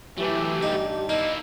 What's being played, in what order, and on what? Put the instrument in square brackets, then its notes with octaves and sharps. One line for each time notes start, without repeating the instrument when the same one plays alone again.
[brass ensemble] E3 [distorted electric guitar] F#3 A3 [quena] G4
[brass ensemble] G2 [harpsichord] D#4
[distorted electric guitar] A#3 E4 [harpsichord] D#4